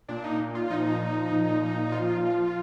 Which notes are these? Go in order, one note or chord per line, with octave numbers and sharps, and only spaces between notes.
A#2 D4
D#4
A#2
F4
F3 D#4
F3
A#2
A#2
F3 F4
F3